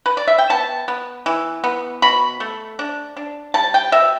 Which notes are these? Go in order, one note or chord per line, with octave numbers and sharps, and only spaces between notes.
B4
D5
E5
G5
B3 A5
B3
E3
B3
B2 B5
A3
D4
D4
G3 A5
G5
B2 E5